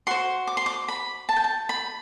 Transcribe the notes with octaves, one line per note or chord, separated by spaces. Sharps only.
F#4 C5 C6
D6
C6
D6
B5
A5
G5
A5
B5